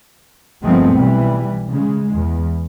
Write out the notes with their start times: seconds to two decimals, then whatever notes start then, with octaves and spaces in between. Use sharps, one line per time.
0.63 G1 F3 G#3 A3 B3 C4
0.94 B1 E3 G3
1.68 C#3 G#3
2.14 E2